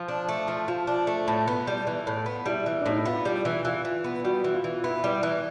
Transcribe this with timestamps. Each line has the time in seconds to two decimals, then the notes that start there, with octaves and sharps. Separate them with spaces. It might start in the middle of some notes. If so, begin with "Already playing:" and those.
Already playing: F3
0.08 D4
0.29 A3
0.48 F3
0.68 F3 F4
0.87 D4
1.07 A3
1.28 A2
1.48 B3
1.67 G3
1.87 E3
2.07 A2
2.26 B3
2.46 G3 E4
2.66 E3
2.80 D4
2.86 A2 D#4
2.98 E4
3.06 B3 F4
3.25 G3
3.45 E3
3.65 E3 F4
3.85 E3
4.04 B3
4.24 G3 F#4
4.44 E3
4.54 F4
4.64 E3
4.84 B3 E4
5.04 G3
5.23 E3